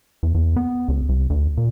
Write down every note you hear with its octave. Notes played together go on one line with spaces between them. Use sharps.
E2
E2
B3
C#2
C2
D2
A#2